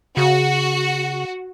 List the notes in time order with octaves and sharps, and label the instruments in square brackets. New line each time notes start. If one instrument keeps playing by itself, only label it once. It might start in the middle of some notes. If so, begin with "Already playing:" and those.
[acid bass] C#3 [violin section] F#4